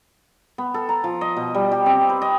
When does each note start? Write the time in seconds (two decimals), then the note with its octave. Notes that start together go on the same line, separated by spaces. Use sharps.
0.58 B3
0.74 A4
0.89 A#5
1.04 F3
1.21 D#5
1.37 B2
1.54 G3
1.72 G4
1.86 C4
2.09 B4
2.22 D#5